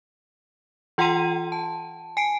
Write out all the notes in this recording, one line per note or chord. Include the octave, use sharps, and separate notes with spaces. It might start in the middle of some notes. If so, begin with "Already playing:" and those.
E3 F4 F#5 G5 C6 D#7
A5
G#5 C7 D7